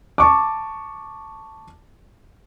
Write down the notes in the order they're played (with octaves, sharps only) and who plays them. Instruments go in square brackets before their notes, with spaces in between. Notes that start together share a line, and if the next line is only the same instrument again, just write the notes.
[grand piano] A5 C#6 D6